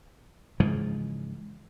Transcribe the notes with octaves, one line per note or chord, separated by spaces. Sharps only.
G#2 C#3 E3 F3